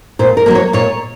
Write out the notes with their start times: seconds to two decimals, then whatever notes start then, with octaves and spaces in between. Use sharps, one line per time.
0.19 A#2 C5
0.37 A#4
0.46 F#3 A#3 C5
0.55 C#5
0.73 A#2 C#5